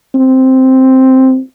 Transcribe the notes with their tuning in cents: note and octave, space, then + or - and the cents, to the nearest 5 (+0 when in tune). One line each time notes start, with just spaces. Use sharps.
C4 +0